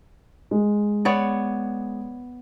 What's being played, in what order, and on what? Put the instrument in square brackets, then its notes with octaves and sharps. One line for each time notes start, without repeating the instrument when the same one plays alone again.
[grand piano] G#3
[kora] B3 C#5 D5